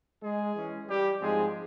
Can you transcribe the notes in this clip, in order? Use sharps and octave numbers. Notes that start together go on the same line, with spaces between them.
G#3 G#4
E3 G#3 C#4
G3 G4
G#2 F3 G#3 C4 G#4